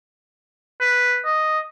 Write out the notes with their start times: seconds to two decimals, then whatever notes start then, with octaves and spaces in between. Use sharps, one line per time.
0.81 B4
1.25 D#5